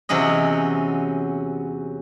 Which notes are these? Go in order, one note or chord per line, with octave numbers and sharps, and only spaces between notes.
E2 C3 F#3 C#4 D#5